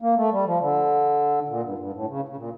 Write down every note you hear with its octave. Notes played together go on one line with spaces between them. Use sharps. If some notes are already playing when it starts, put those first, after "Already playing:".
A#3
A3
G3
F3
D3
A#2
G2
G2
A2
C#3
C#3
A#2